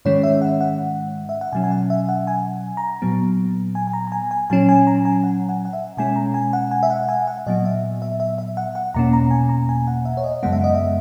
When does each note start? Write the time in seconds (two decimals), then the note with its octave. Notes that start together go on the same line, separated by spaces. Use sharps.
0.05 G#2 D#3 G#3 C#4 C#5
0.23 E5
0.42 F#5
0.61 F#5
1.29 E5
1.41 F#5
1.53 B2 F#3 C#4 G#5
1.64 G#5
1.71 F#5
1.90 E5
2.09 F#5
2.27 G#5
2.77 A#5
3.02 A#2 F#3 B3
3.75 G#5
3.87 G#5
3.93 A#5
4.07 A#5
4.12 G#5
4.31 G#5
4.50 A#2 F#3 C#4 G#5
4.69 G#5
4.87 A#5
5.05 G#5
5.24 F#5
5.49 F#5
5.65 F#5
5.73 E5
5.97 B2 G#3 C#4 G#5
6.16 A#5
6.34 G#5
6.53 F#5
6.71 G#5
6.83 E5
6.90 F#5
7.08 G#5
7.27 F#5
7.46 A#2 F#3 B3 D#5
7.65 E5
8.02 E5
8.20 E5
8.38 E5
8.57 F#5
8.75 F#5
8.94 E2 B2 A#3 C#4 A#5
9.13 A#5
9.31 G#5
9.49 A#5
9.69 G#5
9.87 F#5
10.05 E5
10.17 C#5
10.24 D#5
10.43 F#2 C#3 G#3 B3 F#5
10.52 E5
10.64 D#5
10.75 E5